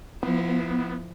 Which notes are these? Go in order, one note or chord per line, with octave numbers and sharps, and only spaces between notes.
F3 B3 E4